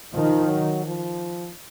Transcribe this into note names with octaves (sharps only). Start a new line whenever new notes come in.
D#3 F3
F#3
F3